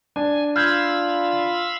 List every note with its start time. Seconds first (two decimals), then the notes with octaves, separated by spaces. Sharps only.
0.16 D4 G#5
0.56 F4 F5 B5 E6 F6 G6 G#6